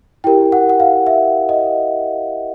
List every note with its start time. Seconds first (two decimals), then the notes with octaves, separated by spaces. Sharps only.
0.24 E4 G4 A#4 G5
0.52 F#5
0.69 F#5
0.80 F5
1.07 E5
1.49 D#5